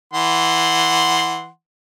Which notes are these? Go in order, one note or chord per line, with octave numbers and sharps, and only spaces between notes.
E3 F#5 C6